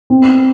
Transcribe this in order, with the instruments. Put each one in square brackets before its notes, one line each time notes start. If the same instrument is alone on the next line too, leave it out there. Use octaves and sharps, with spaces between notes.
[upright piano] C4